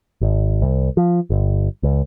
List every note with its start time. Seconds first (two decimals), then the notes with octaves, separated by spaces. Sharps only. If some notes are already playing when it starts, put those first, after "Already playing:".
0.21 G#1
0.62 C2
0.97 F3
1.30 G1
1.83 C#2